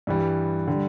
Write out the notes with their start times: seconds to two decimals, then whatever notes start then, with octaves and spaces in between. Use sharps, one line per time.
0.07 G2 E3 G3
0.67 D3 G3